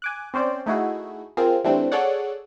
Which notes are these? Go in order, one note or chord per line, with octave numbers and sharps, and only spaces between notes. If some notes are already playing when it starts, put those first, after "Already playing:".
G#5 D6 F#6
C4 C#4 C5 D5
A3 D#4 E4 F#4 G#4
C4 F4 G#4 A#4
E3 G3 A3 C4 D4
G#4 A4 C#5 D5 F#5